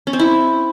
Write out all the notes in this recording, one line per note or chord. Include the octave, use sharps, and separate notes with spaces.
C#4
C4
E4